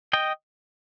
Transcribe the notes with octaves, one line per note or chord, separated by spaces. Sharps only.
D#5 G5